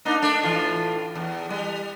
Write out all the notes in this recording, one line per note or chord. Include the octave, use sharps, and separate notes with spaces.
A#3 D4 D#4
A3 D4
A2 E3 F4
E2
G3